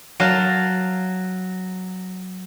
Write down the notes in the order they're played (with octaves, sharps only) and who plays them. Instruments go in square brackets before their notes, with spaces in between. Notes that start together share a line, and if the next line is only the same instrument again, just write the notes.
[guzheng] F#3 F5 A5